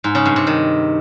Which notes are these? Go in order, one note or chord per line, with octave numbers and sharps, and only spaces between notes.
G#2
C#3
G2
C3
D#3